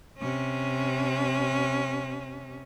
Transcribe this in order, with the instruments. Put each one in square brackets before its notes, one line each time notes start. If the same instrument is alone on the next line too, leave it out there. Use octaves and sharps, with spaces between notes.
[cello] C3 C#4